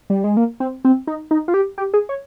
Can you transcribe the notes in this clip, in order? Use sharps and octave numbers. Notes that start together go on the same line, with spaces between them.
G3
G#3
A#3
C4
C4
D#4
D#4
F4
G4
G4
G#4
C#5